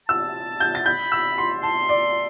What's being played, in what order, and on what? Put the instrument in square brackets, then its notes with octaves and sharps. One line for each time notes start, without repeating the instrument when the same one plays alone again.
[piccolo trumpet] A5 [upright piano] E6
[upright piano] G6
A6
[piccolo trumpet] B5 [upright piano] G6
[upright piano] E6
C6
[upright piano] A5 [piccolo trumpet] C6
[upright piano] D5